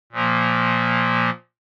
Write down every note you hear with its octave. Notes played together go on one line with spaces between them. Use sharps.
A#2 F3 A#3